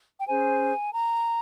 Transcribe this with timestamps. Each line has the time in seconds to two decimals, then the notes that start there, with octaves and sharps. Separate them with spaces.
0.20 G5
0.28 C#4 G#4 C5 G#5
0.92 A#5